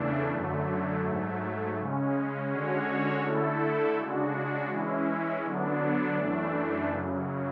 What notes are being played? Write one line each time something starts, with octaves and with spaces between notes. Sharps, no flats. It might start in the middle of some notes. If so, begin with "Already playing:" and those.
Already playing: E2 C#3 E3 A3 D4
F#2 D3 F#3 A3
G#2 F#3 A3
C#3 G#3 C#4
D3 G#3 C#4 F#4 C#5
D3 A3 E4 A4
C#3 G#3 D4 F#4
E3 G#3 C#4 E4
D3 F#3 B3 D4
F#2 E3 A3 D4
F#2 C#3 F#3